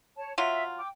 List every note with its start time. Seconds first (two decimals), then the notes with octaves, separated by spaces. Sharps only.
0.16 C#5 A5
0.38 F#3 F4 E5
0.78 G5 D6